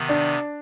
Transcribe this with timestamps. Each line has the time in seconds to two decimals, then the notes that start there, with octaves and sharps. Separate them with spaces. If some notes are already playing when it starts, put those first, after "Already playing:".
Already playing: C3 D#3 B3
0.09 D4